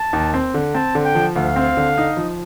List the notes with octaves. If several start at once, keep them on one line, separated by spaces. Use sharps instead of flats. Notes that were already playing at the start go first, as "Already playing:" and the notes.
Already playing: A5
D#2
C4
D3
C4 A5
D3
G5
F3
D2 F5
C4
D3
D#4
F3